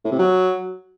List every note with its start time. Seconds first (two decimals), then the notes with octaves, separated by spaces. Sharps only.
0.05 A2
0.12 C3
0.19 F#3